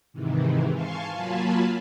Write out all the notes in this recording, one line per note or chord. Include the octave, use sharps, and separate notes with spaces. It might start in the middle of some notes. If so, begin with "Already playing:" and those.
G#2 C3 D#3 E3
F5 G#5 A5 C6 C#6
F#3 A#3 F4 G#5 A5 B5